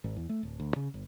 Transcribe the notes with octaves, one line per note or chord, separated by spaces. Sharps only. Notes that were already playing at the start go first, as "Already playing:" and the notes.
G#1
E2
A3
D1
D2
C#3
G1